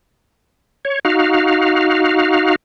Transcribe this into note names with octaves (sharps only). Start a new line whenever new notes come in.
C#5
D#4 F#4 F5